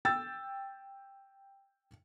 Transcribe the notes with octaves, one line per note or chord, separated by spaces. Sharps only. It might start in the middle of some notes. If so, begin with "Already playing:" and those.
G5 E6 A6